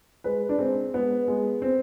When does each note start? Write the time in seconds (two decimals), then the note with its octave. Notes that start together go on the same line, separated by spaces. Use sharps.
0.24 G#3 B4
0.49 D4
0.59 G#3 C4
0.94 G#3 B3
1.28 G#3
1.62 C4